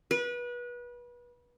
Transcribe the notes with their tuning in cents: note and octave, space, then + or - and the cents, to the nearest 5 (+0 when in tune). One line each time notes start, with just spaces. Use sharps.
B4 -30